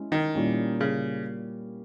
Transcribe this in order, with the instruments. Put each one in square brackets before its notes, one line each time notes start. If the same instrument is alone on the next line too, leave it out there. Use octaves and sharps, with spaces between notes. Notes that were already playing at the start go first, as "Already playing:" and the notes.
Already playing: [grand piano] G#3 C#4 E4
[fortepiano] D#3
[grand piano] A#2 G3 A#3 C#4 E4
[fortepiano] C#3